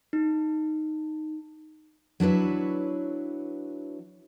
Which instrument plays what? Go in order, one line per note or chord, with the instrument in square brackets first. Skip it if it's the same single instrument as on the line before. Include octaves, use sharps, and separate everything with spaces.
[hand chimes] D#4
[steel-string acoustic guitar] F#3 D4 E4 B4 C#5